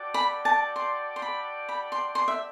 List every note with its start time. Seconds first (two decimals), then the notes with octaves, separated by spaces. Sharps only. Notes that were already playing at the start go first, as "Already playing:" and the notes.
Already playing: F#4 A4 D5 G5
0.14 B5
0.45 A5
0.76 C6
1.16 C6
1.22 B5
1.69 B5
1.92 C6
2.15 C6
2.28 E5